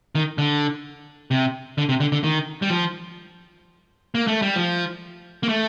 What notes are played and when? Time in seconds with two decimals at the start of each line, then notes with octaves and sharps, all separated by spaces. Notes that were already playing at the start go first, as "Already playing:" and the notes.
0.15 D#3
0.38 D3
1.31 C3
1.78 D3
1.89 C3
2.00 D3
2.12 D3
2.24 D#3
2.62 G3
2.70 F3
4.15 A#3
4.27 A3
4.42 G3
4.56 F3
5.43 A#3
5.49 A3